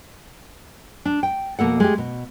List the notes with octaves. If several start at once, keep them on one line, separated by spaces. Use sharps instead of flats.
D4
G5
F2 B2 A#3 A4 F#5
G#3 A3 G4
B2